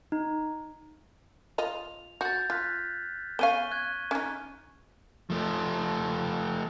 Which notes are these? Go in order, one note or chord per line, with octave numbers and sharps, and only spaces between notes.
D#4
F4 D#5 F7
F#4 G6 A6
F4 F6 F#6 B6
B3 C#4 F5 C#6 D#7 G7
F#6 G#6
C#4 D#4
F3 A3